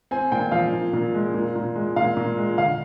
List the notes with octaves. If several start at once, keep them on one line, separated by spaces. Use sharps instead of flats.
C4 G#5
A#2 G5
F3 F5
A#2
A#2
G#3
A#2
A#2
G#3
A#2 F5
A#2
G#3
D3 F5